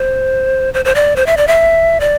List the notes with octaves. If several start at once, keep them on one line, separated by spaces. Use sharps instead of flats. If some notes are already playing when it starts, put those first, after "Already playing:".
Already playing: C5
C5
C5
D5
C5
E5
D5
E5
D5